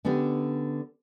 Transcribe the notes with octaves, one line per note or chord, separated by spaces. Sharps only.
D3 B3 C#4 D4 G4